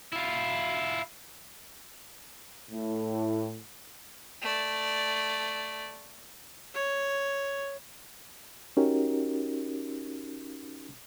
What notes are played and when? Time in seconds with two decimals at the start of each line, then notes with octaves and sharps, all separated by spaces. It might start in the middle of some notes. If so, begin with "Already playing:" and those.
0.13 E4 F4
2.71 A2
4.42 A3 D5
6.74 C#5
8.77 C#4 D#4 F#4 G4 A#4